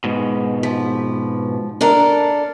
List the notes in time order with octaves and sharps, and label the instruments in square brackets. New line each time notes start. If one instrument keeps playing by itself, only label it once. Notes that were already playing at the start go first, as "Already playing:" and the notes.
[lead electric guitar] G#2 B2
[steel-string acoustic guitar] F3
D4 A4 A#4